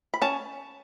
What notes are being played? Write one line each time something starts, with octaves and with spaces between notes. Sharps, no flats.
B5
C#4 A5